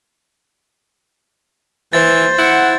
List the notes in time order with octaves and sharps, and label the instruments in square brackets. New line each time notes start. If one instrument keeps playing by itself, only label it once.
[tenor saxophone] E3 [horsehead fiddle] C5 [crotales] A6
[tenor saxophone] E4 [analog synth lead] F#5